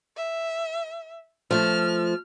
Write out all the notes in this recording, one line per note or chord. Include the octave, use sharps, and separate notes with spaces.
E5
F3 A3 F6